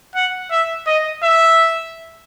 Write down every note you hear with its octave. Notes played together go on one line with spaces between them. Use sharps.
F#5
E5
D#5
E5